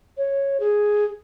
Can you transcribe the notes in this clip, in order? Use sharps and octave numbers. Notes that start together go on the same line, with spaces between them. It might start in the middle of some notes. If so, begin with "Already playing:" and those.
C#5
G#4